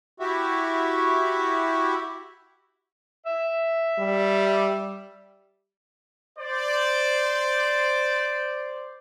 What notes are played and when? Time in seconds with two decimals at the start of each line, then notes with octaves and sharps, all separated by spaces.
0.20 E4 F#4 G4 E5
3.27 E5
3.99 G3
6.38 C5 D5